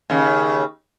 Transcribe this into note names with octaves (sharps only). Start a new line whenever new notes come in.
D#2 C#3